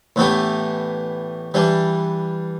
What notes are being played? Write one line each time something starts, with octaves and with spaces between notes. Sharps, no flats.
A2 E3 B3 D4 G4
E3 G3 D4